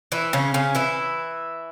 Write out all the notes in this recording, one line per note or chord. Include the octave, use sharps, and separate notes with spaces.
E3 E4
C#3 C#4
C#3 C#4
E3 E4